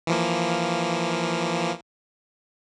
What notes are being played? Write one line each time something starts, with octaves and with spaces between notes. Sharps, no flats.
E3 F3 A#3